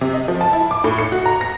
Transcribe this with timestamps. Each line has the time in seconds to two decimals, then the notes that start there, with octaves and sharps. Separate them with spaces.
0.01 C3
0.13 D#5
0.28 F3
0.41 A5
0.53 E4
0.71 D6
0.84 A2
0.98 C#7
1.12 F#4
1.26 A#5
1.41 A#6